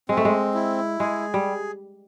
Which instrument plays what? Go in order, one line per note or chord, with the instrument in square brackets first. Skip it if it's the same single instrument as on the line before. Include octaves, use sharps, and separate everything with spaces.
[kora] G#3 [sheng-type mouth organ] C4
[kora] A3
G#3
[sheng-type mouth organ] E4
[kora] G#3 [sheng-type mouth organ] G#4
[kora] G3